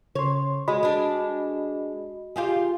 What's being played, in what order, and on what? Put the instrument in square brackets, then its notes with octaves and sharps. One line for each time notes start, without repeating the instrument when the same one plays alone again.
[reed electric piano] C#3 C6 [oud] C#5
[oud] G#3 [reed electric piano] F#4 D#5 B5
[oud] G#3 D4
F4 G4 G#4